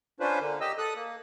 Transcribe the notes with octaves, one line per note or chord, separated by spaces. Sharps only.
C#4 D4 F4 B4 C5
D3 A#3
G4 D#5 E6
A4 D#6 F#6
A#3